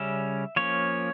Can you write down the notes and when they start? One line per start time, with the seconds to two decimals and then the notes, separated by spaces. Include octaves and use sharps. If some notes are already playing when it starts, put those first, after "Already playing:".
Already playing: C#3 G3 C#4 E5
0.56 F3 A#3 C#4 C#5